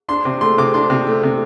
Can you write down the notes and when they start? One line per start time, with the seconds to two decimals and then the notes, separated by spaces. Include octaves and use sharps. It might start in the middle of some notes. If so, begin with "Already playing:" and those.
0.08 D4 C6
0.25 C3
0.41 A3 C6
0.58 C3 D6
0.74 D4 C6
0.90 C3
1.07 A3
1.23 C3